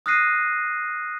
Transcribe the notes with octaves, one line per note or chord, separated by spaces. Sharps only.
D#6 F6 F#6 A#6 C7 D#7